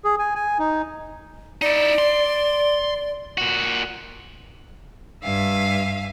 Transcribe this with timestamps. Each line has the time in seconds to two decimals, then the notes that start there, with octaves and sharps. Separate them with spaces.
0.04 G#4
0.19 G#5
0.35 G#5
0.59 D#4
1.62 D#4 E4 D5
1.98 C6
3.38 A#2 F#4
5.22 G2 E5 F5 G#5